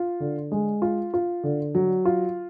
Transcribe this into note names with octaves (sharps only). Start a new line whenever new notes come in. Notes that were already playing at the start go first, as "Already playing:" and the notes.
Already playing: F4
D3
G#3
F4
F4
D3
F#3
F4